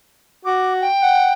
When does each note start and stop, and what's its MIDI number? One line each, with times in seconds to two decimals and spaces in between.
0.45 0.85 66
0.45 0.73 86
0.81 1.33 79
1.02 1.32 78